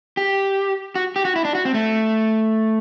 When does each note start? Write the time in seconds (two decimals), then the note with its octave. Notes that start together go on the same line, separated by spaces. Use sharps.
0.17 G4
0.95 F#4
1.16 G4
1.25 F#4
1.36 E4
1.45 D4
1.55 F#4
1.65 C4
1.74 A3